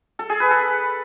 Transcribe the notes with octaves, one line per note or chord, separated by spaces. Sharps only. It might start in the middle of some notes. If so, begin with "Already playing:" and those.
A4
G#4
B4
A4